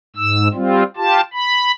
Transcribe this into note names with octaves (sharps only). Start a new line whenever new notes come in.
G#2 E6
G3 C4 F4
F4 G4 A5
B5